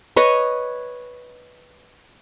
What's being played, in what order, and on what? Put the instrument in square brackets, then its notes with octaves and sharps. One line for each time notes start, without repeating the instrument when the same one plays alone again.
[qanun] B4 C#5 D#5